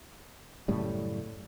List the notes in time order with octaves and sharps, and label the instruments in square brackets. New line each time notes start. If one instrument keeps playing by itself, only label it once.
[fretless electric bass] F#2 A2 C#3 G3